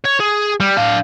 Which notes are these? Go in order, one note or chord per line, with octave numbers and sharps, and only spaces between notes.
C#5
G#4
G3
D4 F5